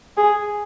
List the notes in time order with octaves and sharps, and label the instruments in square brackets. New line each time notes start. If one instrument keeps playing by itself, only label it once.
[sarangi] G#4